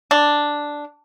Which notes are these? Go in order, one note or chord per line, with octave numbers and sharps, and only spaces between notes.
D4